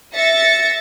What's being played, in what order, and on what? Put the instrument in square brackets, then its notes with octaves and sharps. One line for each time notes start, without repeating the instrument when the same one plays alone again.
[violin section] E5 A6 A#6 C#7